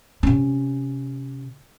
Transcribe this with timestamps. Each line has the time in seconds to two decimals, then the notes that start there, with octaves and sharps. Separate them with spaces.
0.23 C3 C#4